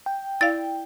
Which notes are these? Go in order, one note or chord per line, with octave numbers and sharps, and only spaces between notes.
G5
E4 D5 F5 A6